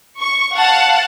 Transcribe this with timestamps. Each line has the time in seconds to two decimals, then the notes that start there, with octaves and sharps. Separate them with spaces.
0.19 C#6
0.55 F5 F#5 A5